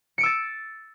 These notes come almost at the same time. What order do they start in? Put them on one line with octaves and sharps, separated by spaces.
C#7 D7 E6 A6